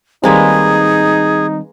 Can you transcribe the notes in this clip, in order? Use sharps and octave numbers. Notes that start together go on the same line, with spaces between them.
D#3 G3 G#3 A#3 C4 D#4 G#4 B4